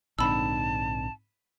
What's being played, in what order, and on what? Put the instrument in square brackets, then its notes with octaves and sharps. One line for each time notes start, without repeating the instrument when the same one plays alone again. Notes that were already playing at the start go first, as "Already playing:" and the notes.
[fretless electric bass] A#1 D3 [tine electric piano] G#2 C4 D#4 [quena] A5 [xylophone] B5 E6